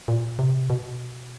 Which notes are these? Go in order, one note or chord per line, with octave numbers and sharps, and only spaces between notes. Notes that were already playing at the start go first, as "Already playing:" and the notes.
A#2
C3
B2